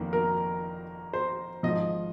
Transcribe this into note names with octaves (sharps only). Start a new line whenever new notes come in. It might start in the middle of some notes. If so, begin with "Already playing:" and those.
Already playing: F1 F2 D#3 A#3
A#4
C5
G#1 G#2 F3 D#5